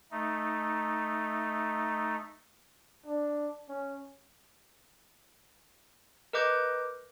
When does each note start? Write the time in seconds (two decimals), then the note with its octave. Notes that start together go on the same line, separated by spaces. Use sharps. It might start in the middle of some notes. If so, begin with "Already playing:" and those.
0.11 A3 D#4
3.06 D4
3.69 C#4
6.33 A#4 B4 D#5 D6 G6